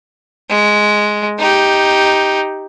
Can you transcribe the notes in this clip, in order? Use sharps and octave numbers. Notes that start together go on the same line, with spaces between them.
G#3
D#4 G4